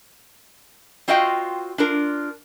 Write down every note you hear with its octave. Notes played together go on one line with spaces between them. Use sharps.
C4 F4 F#4 D#5 F5 G5
D4 F4 A#4